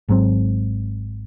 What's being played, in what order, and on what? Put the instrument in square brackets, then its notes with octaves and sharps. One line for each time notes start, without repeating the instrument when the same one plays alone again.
[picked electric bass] G#1 G#2 F#3 C4